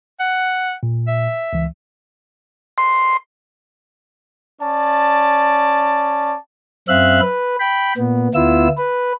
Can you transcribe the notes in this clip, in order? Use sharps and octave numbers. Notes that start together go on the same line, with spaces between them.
F#5
A#2
E5
C#2 E3
C6
C#4 D5 A5
F#2 C4 E5 F5 F#6
B4
G5 B5
A#2 B3
D2 B3 E4 F4 E6
B4